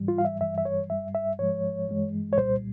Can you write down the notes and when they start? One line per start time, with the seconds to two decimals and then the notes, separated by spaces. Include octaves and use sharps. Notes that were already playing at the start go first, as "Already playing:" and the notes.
Already playing: G#2 E3 G3
0.08 F4
0.18 F5
0.25 E5
0.41 G2 E3 G3 E5
0.58 E5
0.65 C#5
0.90 G2 G3 E5
1.15 E5
1.39 G#2 F3 G#3 C#5
1.88 G2 E3 G#3
2.33 C#5
2.37 C2 A#2 G3 C5